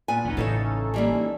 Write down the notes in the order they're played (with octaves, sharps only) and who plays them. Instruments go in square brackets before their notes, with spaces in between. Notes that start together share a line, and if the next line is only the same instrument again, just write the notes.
[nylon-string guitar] A#2 G#5 [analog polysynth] B3
[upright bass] G#1 D2 [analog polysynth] B3 C#4 D#4
[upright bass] A1 [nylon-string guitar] C#3 E3 C#5 [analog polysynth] C#4 D#4 A4
[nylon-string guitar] E3 G3 A#3